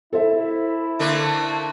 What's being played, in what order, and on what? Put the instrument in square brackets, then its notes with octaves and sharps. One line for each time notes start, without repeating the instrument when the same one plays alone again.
[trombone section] E4 [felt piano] A4 C5 E5
[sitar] D3 A3 A#3